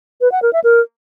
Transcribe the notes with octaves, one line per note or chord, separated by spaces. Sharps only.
B4
F#5
A#4
E5
A#4